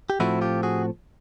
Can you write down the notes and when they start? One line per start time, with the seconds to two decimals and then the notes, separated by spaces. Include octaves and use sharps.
0.10 G4
0.20 A2 F3 A3 C4 E4 F#4
0.41 F4 G4
0.63 F#4 G#4